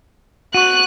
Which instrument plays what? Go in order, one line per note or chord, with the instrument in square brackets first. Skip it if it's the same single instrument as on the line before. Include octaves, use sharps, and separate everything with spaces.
[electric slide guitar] F#4 [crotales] C#6 D#7 [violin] F#6